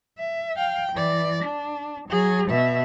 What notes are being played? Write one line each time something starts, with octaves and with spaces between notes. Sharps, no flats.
E5
F5 G5
E3 D5
D4
F#3 G#4
B2 E5